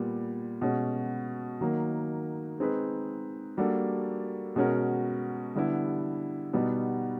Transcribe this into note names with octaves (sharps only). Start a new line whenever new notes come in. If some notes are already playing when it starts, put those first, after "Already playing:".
Already playing: A#2 G3 B3
B2 G#3 C#4 F#4
D#3 F#3 A#3
G#3 C4 D#4 G#4 B4
G3 A#3 D4 F#4 A4
B2 G#3 C#4 F#4 A#4
D3 G3 B3 E4
B2 G3 B3 D#4 F#4